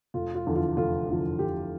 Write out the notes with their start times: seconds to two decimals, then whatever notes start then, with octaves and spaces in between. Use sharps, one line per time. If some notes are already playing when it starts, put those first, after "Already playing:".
0.14 F1 F4
0.35 F4
0.46 E2 D3 F3
0.56 F4
0.77 F1 F4
1.09 E2 D3 F3
1.39 F1 G4